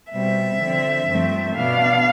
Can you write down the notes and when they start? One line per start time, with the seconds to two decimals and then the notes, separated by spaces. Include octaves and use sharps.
0.11 B2 G3 C4 E5
0.59 D3 F3 C4
1.07 G2 F3 A3 C4
1.55 B2 B3 D4 F5